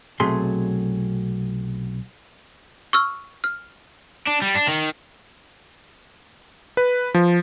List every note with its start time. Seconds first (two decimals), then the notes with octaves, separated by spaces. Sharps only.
0.20 B1 C3 F#3 A3 G#4 C6
2.93 C#6 E6 F6
3.44 F6
4.27 D4
4.42 G3
4.55 D4
4.68 D#3
6.77 B4
7.14 F3